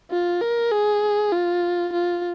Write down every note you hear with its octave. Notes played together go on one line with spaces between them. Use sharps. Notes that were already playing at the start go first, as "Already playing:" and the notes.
F4
A#4
G#4
F4
F4